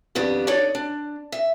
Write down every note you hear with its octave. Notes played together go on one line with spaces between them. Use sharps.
F2 D#3 G3 B3 D4
D4 D#4 A4 C#5 D5
D4
E5